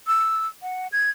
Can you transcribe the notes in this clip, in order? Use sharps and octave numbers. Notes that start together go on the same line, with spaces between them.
E6
F#5
G#6